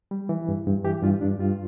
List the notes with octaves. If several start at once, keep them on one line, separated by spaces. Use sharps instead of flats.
G3
E3
G2
G2
E3 G4
G2 F4
G2 D4
G2 F4